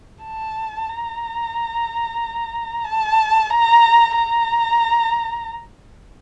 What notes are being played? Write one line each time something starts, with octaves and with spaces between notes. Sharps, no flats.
A5
A#5
A5
A#5
A#5